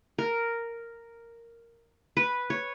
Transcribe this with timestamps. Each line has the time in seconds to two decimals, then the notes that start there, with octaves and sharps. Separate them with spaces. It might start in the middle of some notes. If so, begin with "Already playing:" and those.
0.18 A#4
2.17 B4
2.50 C#5